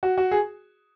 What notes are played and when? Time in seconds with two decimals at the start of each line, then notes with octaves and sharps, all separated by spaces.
0.03 F#4
0.18 F#4
0.31 G#4